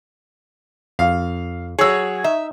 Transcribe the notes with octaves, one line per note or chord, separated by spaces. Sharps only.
F2 F5
F#3 G#4 C#5 E6
D#4 E5